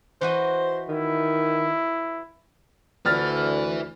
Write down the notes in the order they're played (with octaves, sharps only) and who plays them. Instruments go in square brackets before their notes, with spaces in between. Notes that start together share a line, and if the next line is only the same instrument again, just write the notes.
[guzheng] E3 F#4 D#5 [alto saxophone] C5
[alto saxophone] D#3 [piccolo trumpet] E4
[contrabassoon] D2 [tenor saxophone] D3 [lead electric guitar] E4 B4 [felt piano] F6 A6